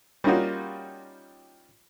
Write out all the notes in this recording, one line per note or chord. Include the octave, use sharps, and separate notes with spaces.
G3 A#3 C#4 D#4 F4 F#4